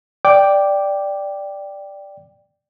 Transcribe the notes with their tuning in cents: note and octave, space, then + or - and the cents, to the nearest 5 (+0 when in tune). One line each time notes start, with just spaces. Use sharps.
D5 +0 G5 +0 D6 +0